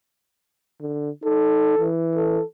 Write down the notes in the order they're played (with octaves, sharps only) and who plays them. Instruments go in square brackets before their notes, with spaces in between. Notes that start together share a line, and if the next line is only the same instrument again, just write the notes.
[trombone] D3
[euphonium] D#4 [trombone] A4
[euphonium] E3
[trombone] A4